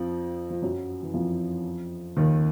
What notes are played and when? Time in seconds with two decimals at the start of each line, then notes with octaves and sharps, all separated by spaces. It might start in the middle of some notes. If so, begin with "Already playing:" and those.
Already playing: F2 F3
0.50 F3
0.62 F#2 F#3
1.03 E3
1.14 F2 F3
2.17 D#2 D#3